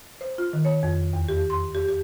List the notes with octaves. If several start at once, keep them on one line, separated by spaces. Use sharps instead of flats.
C5
F4
D#3
C#5
F2
E2
G4
C6
G4
G4